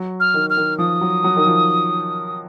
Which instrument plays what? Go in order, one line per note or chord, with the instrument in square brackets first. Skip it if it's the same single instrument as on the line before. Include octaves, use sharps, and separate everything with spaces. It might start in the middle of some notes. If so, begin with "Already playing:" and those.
Already playing: [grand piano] F#3
[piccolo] F6
[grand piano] D#3
[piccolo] F6
[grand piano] D#3
[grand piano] F3 [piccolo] D#6
[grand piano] F#3
F#3
D#3
F3